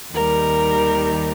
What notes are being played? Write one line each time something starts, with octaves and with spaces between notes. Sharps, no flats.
D#2 D#3 G3 A#4